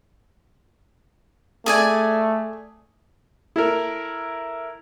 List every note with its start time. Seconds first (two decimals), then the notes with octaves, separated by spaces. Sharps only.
1.66 A3 G#4 D5 G#5
3.56 E4 A4 A#4